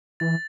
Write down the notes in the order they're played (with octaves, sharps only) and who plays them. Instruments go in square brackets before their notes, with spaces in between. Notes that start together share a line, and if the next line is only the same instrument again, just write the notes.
[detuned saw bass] E3 [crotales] A6